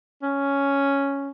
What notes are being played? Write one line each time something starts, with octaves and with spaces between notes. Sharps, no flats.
C#4